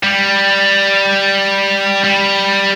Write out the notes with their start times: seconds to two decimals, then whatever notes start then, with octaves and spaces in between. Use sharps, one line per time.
0.03 G3
2.04 G3